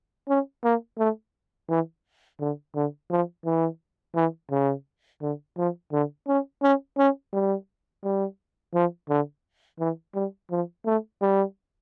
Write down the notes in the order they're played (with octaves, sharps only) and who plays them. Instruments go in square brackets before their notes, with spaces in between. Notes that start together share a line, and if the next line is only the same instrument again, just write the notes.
[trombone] C#4
A#3
A3
E3
D3
D3
F3
E3
E3
C#3
D3
F3
D3
C#4
C#4
C#4
G3
G3
F3
D3
E3
G3
F3
A3
G3